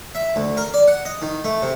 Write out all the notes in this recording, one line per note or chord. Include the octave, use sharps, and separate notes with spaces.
E5
D2
A#4
D5
F#5
D#5
D#3
A3
C3